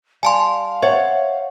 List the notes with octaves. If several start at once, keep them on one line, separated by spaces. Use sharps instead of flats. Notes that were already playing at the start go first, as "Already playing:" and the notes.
G3 F5 G#5 A5 C6
C5 C#5 E5 F#5